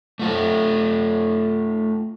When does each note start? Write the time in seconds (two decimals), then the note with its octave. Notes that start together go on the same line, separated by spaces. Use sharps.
0.19 A3 F4 A4